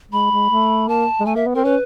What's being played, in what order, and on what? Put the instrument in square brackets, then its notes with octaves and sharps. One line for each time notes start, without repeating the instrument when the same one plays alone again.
[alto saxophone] G#3 [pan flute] B5
[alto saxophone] G#3
A3
[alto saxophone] A#3 [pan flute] A5
[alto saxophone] G#3
[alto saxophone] A3 [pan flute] G#5
[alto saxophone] A#3 [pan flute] E5
[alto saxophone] B3
[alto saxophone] C4 [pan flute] A#4
[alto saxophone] C#4 [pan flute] B4